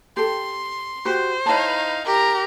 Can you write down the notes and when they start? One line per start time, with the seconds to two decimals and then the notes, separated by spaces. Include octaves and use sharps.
0.17 G4 A4 C6
1.05 F#4 G4 C5
1.46 D#4 E4 C#5 F5 A5
2.06 G4 A#4 A#5